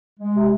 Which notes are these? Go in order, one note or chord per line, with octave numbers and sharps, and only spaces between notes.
G#3
C3